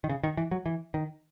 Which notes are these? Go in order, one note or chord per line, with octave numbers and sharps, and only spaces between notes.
D#3
C#3
D#3
E3
F#3
E3
D#3